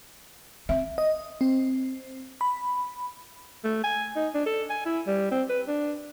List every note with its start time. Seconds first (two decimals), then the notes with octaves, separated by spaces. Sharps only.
0.69 C4 E5
0.98 D#5
1.41 C4
2.41 B5
3.64 A3
3.84 G#5
4.16 D#4
4.35 D4
4.46 A4
4.70 G#5
4.86 E4
5.07 G3
5.31 C4
5.50 B4
5.67 D4